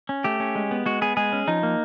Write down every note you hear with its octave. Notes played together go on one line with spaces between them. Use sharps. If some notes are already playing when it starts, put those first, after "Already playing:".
C#4
A3 G4
C#4
G#3
B3
G#3 F#4
B3 G#4
G#3 G#4
C#4
F3 D#4
A#3